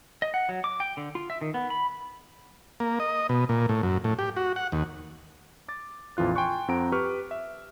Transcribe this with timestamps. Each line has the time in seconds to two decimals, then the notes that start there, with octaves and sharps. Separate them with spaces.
0.22 D#5
0.34 F#5
0.49 F#3
0.64 D6
0.80 G5
0.97 D3
1.15 F4
1.30 E5
1.41 D#3
1.54 B3
1.70 B5
2.80 A#3
3.00 D#5
3.29 B2
3.49 A#2
3.69 A2
3.83 F#2
4.04 A2
4.19 G4
4.37 F#4
4.56 F#5
4.72 D#2
5.68 D6 A6
6.17 A#1 F2 E3 F4 F#6
6.35 G5 G#5 C6 C#6 F#6
6.68 F2 C4 F#5 A#5 D7
6.92 G4 B4 C#6 F6
7.31 E5